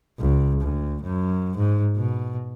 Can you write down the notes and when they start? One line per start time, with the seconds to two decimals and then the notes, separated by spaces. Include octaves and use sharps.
0.19 C#2
0.61 D2
1.02 F#2
1.56 G#2
1.96 B2